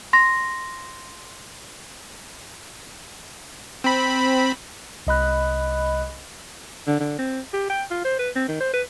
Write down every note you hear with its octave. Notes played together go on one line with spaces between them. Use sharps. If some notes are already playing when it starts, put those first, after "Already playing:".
C6 A#6
C4 B5
C2 D#5 B5 F#6
D3
D3
C4
G4
G5
F4
C5
B4
C4
D#3
C5
B4